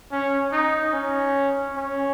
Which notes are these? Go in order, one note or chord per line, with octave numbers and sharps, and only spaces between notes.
C#4
D#4
C#4
C#4